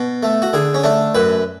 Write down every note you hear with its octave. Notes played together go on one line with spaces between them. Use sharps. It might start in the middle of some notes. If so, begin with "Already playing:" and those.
Already playing: B2
A3
F#4
D3 G#4
C#4
A3 D4
F#2 B4